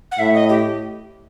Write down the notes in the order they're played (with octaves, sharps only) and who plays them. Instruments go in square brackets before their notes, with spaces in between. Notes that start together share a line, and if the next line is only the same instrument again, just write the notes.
[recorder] F#5
[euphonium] A2 [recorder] E5
[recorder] D#5
G4